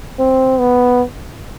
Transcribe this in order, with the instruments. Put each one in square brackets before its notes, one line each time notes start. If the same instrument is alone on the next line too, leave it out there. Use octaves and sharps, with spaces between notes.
[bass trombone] C4
B3